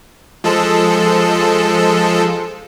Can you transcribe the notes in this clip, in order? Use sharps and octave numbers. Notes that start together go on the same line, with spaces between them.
F3 G#3 A4